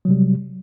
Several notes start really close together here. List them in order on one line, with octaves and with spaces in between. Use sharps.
F#3 C3 G3